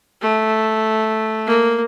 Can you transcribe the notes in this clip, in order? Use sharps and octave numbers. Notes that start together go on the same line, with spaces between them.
A3
A#3